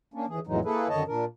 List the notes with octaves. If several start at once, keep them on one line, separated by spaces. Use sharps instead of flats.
A#3 C#4 D4
D#2 E3 G#4
F2 A2 E3 F#3 G#3 D#4
A#3 E4 G#4 A4 B4
F#2 D3 D#3 C#5 D#5 A5
A#2 D4 A#4